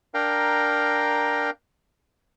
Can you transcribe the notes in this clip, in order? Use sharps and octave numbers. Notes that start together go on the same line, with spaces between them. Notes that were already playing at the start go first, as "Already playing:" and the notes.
D4 A#4 F5 G5 A#5